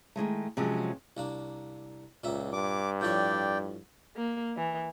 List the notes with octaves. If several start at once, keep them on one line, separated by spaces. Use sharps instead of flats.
D#3 E3 G#3 A3
C3 F3 F#3 G#3 C#4
C2 A#3 D4
C#2 A#2 A#3 E5
G2 D6
A2 F3 C#5 D5 G5
A#3
E3